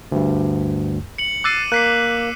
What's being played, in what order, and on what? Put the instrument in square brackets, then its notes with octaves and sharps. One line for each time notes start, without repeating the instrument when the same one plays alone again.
[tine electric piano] D2 G2
[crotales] C#7 F#7
[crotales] D6 E6 D#7 [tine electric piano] F#6 A6 C7
[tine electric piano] A#3 [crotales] F#6 B6 C7